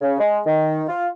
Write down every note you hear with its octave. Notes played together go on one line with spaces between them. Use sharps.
C#3
G#3
D#3
F4